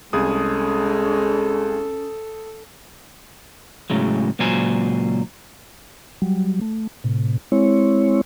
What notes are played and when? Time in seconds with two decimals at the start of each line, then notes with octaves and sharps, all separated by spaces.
0.13 C2 G#3 C#4 G#4 A4 D#6
3.90 A2 C#3 F#3 G#3
4.39 C#2 A#2 F#3 C5 G#5
6.22 F#3 G3
6.61 A3
7.04 A2 C3
7.52 G#3 C4 E4 C#5